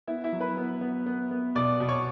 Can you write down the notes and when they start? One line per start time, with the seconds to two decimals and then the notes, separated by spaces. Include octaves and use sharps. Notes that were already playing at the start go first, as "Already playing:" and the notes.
0.07 B3 E4 E5
0.24 E4 E5
0.33 F#3
0.41 B4 B5
0.57 B3
0.81 B3
1.06 B3
1.31 B3
1.55 B2 D5 D6
1.80 B2
1.89 C#5 C#6